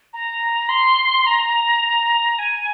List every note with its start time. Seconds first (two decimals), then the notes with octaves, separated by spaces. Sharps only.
0.13 A#5
0.69 C6
1.26 A#5
2.39 G#5